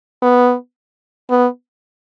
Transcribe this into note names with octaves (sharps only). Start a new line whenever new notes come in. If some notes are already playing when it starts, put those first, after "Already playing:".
B3
B3